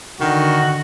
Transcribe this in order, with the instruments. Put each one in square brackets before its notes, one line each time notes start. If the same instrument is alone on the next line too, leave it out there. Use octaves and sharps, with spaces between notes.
[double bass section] D3 [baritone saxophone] D#3 [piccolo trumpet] F#4